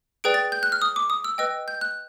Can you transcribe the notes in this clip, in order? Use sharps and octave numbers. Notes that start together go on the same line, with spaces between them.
G#4 B4 D5 G5 D7
A6
G6
F#6
F6
D#6
D6
D#6
E6
B4 D#5 G5 E6
G6
F#6